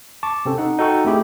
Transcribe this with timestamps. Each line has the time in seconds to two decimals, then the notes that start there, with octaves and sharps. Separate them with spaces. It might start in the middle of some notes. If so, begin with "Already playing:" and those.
0.23 A5 C#6 D6
0.45 C3 C4 C#4 A4
0.58 D#4 F#5
0.79 D#4 F#4 A4 F#5 G5 C#6
1.05 A3 C4 E4 G4 G#4